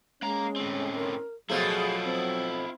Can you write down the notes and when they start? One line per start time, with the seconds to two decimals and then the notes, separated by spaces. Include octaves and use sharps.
0.22 G#3 A#3 C#4 A#5
0.56 A2 C4
0.95 A#4
1.50 B2 F3 F#3 A3 E4 F4 G#4
2.05 C4